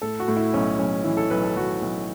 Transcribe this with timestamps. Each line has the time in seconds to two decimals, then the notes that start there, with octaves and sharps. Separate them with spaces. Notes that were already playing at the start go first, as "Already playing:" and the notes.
0.02 A2 A4
0.20 F#4
0.28 A2
0.37 E4
0.54 B1 C#4
0.78 B1 C#4
1.04 E3 E4
1.17 A4
1.30 B1 B4
1.44 A4
1.57 B1 F#4
1.82 B1